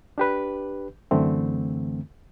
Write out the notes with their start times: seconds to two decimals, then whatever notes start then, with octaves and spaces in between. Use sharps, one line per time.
0.18 D4 G4 B4
1.11 F#2 D3 E3 A3 C4